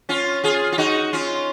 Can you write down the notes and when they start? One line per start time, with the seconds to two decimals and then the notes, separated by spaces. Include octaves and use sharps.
0.09 C#4 F4
0.44 F4 G#4
0.72 F4
0.78 D#4 F#4
1.13 C#4 F4